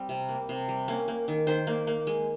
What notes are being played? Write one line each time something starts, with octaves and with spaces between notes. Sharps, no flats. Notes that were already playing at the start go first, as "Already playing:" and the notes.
Already playing: G3 C4
C3
A#3
C3
G3
A#3 C#4
A#3
D#3
D#3 C5
A#3
A#3
G#3